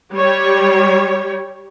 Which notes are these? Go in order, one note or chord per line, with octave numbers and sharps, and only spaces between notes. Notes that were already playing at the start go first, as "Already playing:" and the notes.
G3 C#5